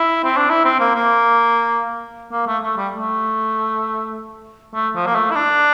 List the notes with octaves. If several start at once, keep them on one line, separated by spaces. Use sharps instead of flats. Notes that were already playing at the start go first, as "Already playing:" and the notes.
Already playing: E4
C4
D4
E4
C4
A#3
A#3
A#3
A3
A3
G3
A3
A3
F3
A#3
A3
E4
D4